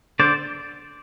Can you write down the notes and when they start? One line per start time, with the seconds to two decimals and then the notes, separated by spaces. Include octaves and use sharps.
0.20 D3 C5 D5